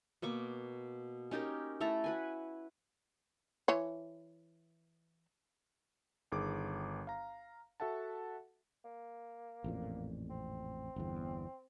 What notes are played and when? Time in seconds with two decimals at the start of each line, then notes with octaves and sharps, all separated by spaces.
0.22 B2 A#3 C#6 D6
1.31 C#4 D#4 G4 A#4
1.80 A3 E4 A4 A#5
2.04 F#4 B4 G#5
3.68 E3 C#5
6.32 G1 D#3 G#4 D6
7.07 F5 A#5
7.80 F#4 A4 E5 F#5 A5
8.85 A#3
9.64 A1 F2 A#2
10.30 C4
10.96 G1 E2